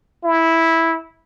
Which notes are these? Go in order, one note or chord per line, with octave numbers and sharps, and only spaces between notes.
E4